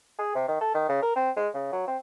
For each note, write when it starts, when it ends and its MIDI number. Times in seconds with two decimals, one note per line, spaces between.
0.19 0.33 68
0.35 0.44 48
0.48 0.58 51
0.61 0.71 69
0.75 0.84 51
0.89 1.02 49
1.02 1.13 70
1.16 1.30 60
1.36 1.48 56
1.54 1.68 49
1.72 1.86 54
1.87 1.97 60